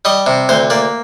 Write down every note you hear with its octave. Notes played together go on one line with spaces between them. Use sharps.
G3 D#5
C3
D2 C5
A#3 D5